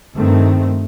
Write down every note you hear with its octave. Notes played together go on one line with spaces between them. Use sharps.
G2 D#3 A3 C4